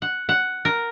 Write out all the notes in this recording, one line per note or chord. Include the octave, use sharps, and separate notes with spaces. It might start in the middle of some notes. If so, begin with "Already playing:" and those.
F#5
F#5
A#4